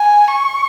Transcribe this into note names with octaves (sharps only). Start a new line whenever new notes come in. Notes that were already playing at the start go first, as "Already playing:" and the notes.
Already playing: G#5
C#6